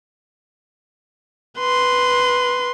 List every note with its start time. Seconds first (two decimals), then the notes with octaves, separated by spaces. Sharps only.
1.59 B4 C6